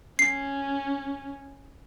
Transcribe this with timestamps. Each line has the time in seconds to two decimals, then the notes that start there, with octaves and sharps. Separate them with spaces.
0.19 C#4 C7